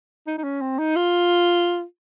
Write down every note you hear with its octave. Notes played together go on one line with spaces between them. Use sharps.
D#4
D#4
C#4
C4
D#4
F4